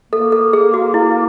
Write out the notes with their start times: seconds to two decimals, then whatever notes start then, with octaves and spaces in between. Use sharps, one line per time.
0.12 A#3 A4
0.32 A4
0.53 G#4
0.74 F#4
0.94 E4